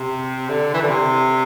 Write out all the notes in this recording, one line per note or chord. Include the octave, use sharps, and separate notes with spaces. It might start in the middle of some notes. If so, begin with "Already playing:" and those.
Already playing: C3
D3
E3
D3
C3